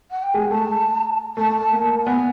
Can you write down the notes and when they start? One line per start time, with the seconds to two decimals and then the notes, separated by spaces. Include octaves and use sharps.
0.11 F#5
0.23 G5
0.34 G#3 G#5
0.51 A3 A5
1.37 A3 A5
1.72 A#3
2.06 B3 G#5